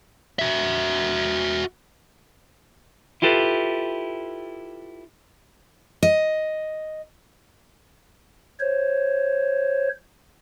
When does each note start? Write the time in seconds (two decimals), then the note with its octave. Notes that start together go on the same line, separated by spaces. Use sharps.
0.39 F#4 E5
3.22 E4 F4 G4 A4 B4
6.03 D#5
8.60 C5 C#5